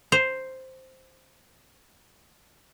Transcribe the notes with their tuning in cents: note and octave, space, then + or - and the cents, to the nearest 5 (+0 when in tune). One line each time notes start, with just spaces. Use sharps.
C5 +0 A#5 +0